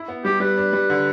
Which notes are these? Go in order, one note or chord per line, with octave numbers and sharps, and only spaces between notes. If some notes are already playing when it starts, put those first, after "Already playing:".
Already playing: E4
B3
G3 G4
G3 B4
D4
G3
D3